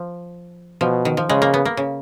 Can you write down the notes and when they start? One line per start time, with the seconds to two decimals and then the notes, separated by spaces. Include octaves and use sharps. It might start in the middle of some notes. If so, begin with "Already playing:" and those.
Already playing: F3
0.81 B2 F3
1.05 D#3
1.17 F3
1.29 C#3 G#3
1.42 A#3
1.54 B3
1.65 A#3
1.77 C#3